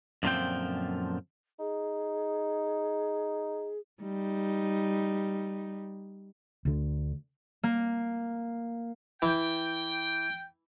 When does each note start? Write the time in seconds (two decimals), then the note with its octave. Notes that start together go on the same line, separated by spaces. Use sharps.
0.23 F#2 A#2 D3 F3 C4 G5
1.59 D#4 G#4
4.03 G3 D#4
6.65 D2 D3
7.64 A#3
9.22 E3 G5